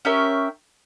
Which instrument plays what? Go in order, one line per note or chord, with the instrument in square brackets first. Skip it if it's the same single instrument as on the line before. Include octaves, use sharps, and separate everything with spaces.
[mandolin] C#4 G4 A#4 E5